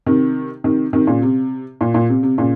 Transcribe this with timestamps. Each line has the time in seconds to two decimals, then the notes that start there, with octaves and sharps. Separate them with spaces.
0.06 C3 D#3
0.64 C3 D#3
0.93 C3 D#3
1.07 A#2 C#3
1.22 C3
1.81 A#2
1.94 A#2
2.09 C3
2.23 C3
2.38 A#2 C#3